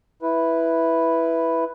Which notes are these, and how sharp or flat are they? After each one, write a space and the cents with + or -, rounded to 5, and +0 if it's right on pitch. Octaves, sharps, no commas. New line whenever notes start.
E4 +0 B4 +0